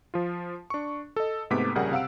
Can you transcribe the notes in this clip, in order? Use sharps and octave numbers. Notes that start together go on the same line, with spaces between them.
F3 F4
D4 C#6
A4 D#5
G#2 C3 A3 B3 D6 B6
A#1 C#3 G3 G#4 A#4 F#5
C3 F5 F#5 E6 D7